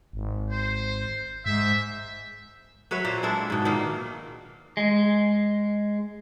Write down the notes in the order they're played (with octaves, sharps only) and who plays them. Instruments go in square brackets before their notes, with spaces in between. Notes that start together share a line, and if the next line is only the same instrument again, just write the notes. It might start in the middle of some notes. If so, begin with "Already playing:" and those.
[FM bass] G#1
[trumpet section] C5
[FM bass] G#2 [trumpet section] C5 E5
[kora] F#3 B4 C#5 E5
A#2 A#3 C5
G#3 D4 E4 A4
G#2 B2
A#2 D#3 A#3
[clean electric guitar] G#3